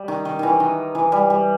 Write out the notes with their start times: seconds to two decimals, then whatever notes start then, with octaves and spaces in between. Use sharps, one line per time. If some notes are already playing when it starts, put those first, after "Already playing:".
Already playing: G3
0.08 D#3
0.25 D#3
0.39 D#3 E3
0.60 D#3
0.95 E3
1.12 G3
1.30 G3